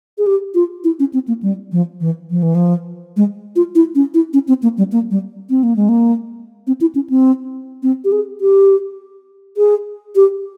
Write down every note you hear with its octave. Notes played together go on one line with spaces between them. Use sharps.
G#4
G4
F4
E4
C#4
C4
A#3
G3
F3
E3
F3
E3
F3
G#3
F4
E4
C#4
E4
C#4
C4
A#3
G3
A#3
G3
C4
A#3
G#3
A#3
C4
E4
C#4
C4
C4
G4
G#4
G4
G#4
G4